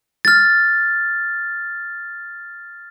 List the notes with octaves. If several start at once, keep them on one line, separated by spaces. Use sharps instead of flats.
F6 A6